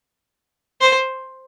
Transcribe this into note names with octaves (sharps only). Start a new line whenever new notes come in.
C5